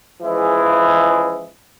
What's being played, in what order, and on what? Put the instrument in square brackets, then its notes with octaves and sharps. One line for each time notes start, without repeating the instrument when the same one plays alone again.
[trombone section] C#2 E3 F3 G#3 E4 G#4